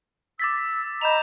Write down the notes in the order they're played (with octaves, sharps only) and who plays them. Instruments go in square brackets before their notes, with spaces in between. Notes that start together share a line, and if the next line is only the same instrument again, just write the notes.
[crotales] D6 A6 B6 [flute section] E6
[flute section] D#5 A#5 B5 [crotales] G6 E7 F7